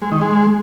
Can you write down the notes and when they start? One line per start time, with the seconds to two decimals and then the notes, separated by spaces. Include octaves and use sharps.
0.02 G#3
0.12 D#3
0.21 G#3